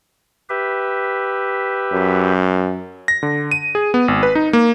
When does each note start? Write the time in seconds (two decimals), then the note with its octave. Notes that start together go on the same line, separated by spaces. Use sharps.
0.49 G4 B4 E5
1.92 F#2
3.08 A#6
3.23 D3
3.51 D#7
3.75 G#4
3.94 B3
4.08 G#1
4.23 B4
4.35 D#4
4.53 A#3